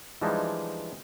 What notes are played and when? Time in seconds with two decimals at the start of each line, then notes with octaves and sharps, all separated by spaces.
0.21 E3 F3 G3 G#3 D4 D#4